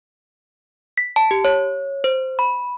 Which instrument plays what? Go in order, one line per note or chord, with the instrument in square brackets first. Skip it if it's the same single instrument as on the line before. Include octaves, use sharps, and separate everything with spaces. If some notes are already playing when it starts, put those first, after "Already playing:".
[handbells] B6
A5
G4
C#5
C5
B5